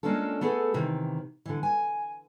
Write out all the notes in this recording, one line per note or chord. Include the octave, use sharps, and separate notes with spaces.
G#3 A#3 C#4 D4 F4 A4
A3 B3 G#4 A4
C3 D#3 E3
D3 E3
G#5